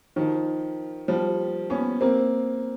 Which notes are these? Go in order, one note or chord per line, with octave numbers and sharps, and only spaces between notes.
D#3 F3
F3 G3
B3 C#4
A#3 C4